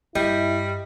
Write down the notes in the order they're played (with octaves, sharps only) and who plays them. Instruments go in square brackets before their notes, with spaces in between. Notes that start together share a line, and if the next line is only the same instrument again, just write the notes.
[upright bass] G2 [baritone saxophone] G3 [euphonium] E4 [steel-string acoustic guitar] D#5